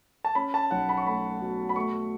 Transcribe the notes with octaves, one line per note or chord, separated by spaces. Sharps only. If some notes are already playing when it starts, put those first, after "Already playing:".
A5
C#4 B5
A5
B1 F#5
B5
C#6
A3 B5
B2
B5
A3 C#6